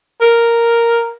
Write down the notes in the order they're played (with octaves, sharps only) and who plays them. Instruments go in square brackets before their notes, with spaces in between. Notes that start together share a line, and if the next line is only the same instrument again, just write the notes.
[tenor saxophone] A#4